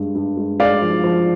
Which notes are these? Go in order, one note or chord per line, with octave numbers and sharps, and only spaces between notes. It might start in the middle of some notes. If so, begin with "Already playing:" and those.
Already playing: G2 G#3
G2
G#3
G#3 D5 F5
F3
F3